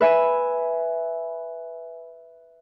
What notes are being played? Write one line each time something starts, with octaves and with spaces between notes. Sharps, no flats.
B4 E5 G#5